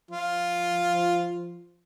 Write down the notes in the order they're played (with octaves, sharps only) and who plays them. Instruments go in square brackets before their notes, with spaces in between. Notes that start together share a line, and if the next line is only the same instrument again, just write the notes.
[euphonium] F3 [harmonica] F4